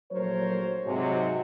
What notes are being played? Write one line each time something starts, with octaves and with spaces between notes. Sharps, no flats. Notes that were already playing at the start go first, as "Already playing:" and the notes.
A#1 F#3 A3 A#4 C5 C#5
G#2 C3 F#3 G#3